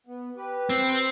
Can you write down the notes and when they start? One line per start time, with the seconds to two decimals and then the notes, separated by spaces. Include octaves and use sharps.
0.07 B3
0.36 G4 B4
0.70 C4